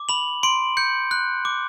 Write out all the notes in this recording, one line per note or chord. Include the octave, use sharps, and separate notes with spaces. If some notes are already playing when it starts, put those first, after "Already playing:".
Already playing: D6
B5 F#7
C6 D7
G6 C#7
F#6
D6